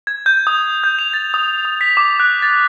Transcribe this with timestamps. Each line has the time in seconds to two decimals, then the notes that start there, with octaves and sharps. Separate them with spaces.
0.07 G#6
0.26 G6
0.47 D#6
0.84 G6
0.99 F7
1.13 A6
1.34 D#6
1.65 D#6
1.81 B6
1.97 D6
2.20 F#6
2.42 A6